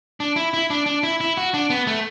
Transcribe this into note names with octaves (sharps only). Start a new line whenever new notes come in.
D4
E4
E4
D4
D4
E4
E4
F#4
D4
B3
A3